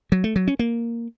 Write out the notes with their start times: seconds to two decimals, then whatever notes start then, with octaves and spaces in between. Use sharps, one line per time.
0.12 F#3
0.24 A3
0.36 F#3
0.48 C#4
0.59 A#3